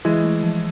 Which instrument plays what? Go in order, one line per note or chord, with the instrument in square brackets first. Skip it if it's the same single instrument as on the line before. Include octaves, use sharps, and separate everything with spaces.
[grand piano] E3 G#3 [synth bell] E4
[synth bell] A3
F3